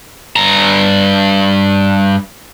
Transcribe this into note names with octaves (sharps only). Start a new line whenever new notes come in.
G2 A#5